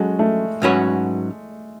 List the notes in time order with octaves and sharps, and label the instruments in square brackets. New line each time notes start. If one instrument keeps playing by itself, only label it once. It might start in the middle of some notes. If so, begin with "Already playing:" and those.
Already playing: [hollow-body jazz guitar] F#3 C#4 F#4 A4 [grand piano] G#3
[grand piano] A3
[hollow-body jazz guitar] G#2 F#3 C#4 F#4 B4